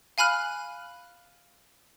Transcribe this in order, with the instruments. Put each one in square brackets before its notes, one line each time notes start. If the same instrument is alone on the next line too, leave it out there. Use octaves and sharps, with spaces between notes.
[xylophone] F5 G#5 B5 F6 F#6